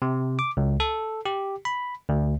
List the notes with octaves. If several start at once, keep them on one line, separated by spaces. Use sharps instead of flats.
C3
D6
C#2
A4
G4
B5
D2